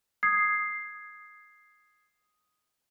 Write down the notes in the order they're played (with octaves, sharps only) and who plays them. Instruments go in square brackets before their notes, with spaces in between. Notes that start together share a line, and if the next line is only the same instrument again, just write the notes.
[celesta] D#6 G#6 C7